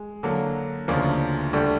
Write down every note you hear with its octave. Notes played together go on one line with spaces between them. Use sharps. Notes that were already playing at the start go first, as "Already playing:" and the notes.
Already playing: G#3
D3 F#3 A#3
D2 C#3 F3 A#3 D4
D2 D3 G3